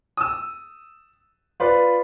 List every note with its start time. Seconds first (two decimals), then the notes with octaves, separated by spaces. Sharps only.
0.17 D#6 E6
1.60 F4 B4 D5